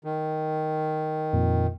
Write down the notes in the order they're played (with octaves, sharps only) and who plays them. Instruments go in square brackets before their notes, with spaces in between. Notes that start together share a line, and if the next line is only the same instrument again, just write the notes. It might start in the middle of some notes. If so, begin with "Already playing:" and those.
[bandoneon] D#3
[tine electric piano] F2 A#2